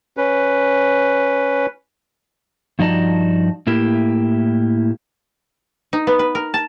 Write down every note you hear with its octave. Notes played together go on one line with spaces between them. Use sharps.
C#4 B4
G2 F3 D#4 F#4 D5 A5
A2 A#3 E4 G4
D#4
B3
B4
A#4
A5